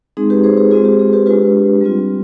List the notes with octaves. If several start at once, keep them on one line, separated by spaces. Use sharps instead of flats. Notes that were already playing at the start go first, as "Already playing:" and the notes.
G#3 C4 D#4 G#4
G4 B4
G#4 C5
G#4 C5
G#3 C4 F4 G#4 C5
G4
G#4
G4 B4
G#3 D4 F4 G4 B4
G3 C4 F4